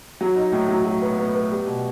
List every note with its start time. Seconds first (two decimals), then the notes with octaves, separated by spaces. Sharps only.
0.21 F#3
0.36 D#4
0.52 A2
0.69 F#3
0.85 F#3
1.02 B3
1.18 B3
1.35 B3
1.51 G3
1.67 B2